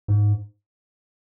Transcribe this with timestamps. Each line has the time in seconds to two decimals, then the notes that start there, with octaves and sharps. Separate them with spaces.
0.08 G#2